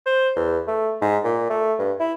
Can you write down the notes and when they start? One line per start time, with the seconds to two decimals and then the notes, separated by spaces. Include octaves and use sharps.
0.06 C5
0.36 E2
0.67 A3
1.02 G#2
1.24 A#2
1.50 A3
1.79 G2
2.00 E4